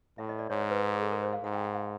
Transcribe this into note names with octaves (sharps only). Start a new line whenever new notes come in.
A2 E5
D#5
D5
G#2 C#5
C5
B4
G#4
A4
A#4
C5
F5
G#2 F#5
G5
F#5
F5